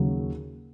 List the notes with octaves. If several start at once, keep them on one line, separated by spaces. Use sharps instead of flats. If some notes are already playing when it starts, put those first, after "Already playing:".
Already playing: D#2 C#3 F#3